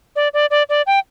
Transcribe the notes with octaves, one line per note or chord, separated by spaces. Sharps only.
D5
D5
D5
D5
G5